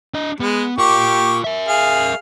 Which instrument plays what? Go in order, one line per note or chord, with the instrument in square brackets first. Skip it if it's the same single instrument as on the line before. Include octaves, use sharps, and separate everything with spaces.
[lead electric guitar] D4 D#5
[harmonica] G#3 [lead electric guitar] B3
[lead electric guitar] F4 A#4 [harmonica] G4 C#6 D6
[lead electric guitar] A#4 E5
[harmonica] G#4 F5